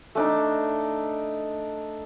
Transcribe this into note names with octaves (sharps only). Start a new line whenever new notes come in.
A3 D4 D#4